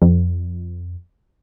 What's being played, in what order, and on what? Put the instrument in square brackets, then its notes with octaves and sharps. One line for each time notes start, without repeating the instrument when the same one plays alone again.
[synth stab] F2